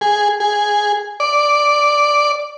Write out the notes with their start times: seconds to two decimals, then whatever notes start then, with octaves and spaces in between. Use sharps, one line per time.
0.01 G#4
0.40 G#4
1.20 D5